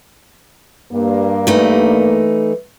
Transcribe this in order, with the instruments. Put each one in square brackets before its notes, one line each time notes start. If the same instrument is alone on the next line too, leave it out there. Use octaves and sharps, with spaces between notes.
[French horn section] G2 A#3
[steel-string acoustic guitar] E3 A3 D#4